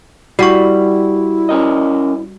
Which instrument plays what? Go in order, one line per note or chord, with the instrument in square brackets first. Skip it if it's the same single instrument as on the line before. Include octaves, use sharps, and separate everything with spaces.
[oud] G3 [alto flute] E4 [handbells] F#4 F#5 C#6
[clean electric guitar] C#4 A#4 D#5